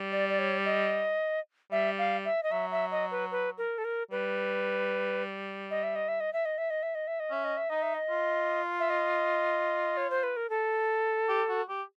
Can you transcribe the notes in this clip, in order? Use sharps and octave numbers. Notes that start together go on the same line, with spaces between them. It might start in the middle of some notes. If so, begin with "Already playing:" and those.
Already playing: G3
D5
D5
C#5
D#5
G3 E5
F5
E5
D#5
F#3 E5
E5
D#5
B4
B4
A#4
A4
A#4
G3 B4
D#5
E5
D#5
E5
D#5
E5
D#5
E5
D#5
E5
D#5
E5
D#5
C#4 E5
D#5
E5
D#4 D#5
E5
D#5
F4
E5
D#5
C#5
C5
B4
A#4
A4
G4
F#4
G4